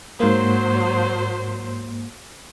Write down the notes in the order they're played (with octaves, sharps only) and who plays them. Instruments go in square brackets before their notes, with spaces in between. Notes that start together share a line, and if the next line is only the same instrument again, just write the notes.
[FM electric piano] G#2 A#3 [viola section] F#3 C5